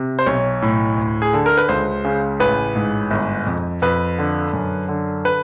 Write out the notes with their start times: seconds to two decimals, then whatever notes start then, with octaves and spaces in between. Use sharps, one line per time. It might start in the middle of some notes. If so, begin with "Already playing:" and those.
Already playing: C3
0.19 C5
0.26 B1 C#5
0.62 A2
0.97 D2
1.22 G#4
1.33 D3 A4
1.46 A#4
1.57 B4
1.69 C#2 C5
2.04 C#3
2.40 A1 B4
2.76 G#2
3.11 G1
3.47 F2
3.82 F2 B4
4.18 D3
4.53 F#2
4.88 D3
5.25 B4